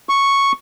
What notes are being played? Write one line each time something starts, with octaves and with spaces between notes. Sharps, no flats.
C#6